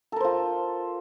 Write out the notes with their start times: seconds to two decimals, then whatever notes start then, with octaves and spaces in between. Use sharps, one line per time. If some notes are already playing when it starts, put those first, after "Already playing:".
0.12 A4
0.16 A#4
0.20 C5
0.25 F4